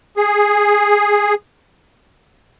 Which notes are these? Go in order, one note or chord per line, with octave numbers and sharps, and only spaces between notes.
G#4